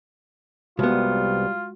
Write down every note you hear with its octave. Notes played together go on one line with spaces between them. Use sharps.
C2 G3 G#3 B3 F4 F#4